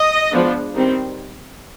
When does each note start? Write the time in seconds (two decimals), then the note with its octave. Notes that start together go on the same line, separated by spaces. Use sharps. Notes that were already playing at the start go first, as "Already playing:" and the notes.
Already playing: D#5
0.31 F3 G#3 B3 D4
0.74 D#3 G3 C4